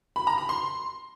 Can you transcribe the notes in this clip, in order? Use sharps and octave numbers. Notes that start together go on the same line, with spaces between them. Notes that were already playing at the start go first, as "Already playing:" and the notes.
B5
A#5
B5
C6